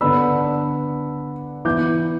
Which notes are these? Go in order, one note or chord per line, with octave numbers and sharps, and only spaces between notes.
D3 B3 D4 B5 E6
E3 B3 E4 D6 G6